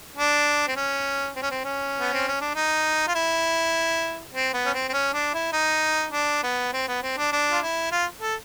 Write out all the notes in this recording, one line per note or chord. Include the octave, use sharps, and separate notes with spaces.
D4
C4
C#4
C4
C#4
C4
C#4
B3
C4
C#4
D4
D#4
F4
E4
C4
B3
C#4
C4
C4
C#4
D4
E4
D#4
D4
B3
C4
B3
C4
D4
D4
F4
E4
F4
A4